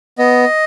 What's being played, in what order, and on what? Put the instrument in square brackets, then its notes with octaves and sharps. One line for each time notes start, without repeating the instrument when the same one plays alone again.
[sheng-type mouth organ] B3 D#5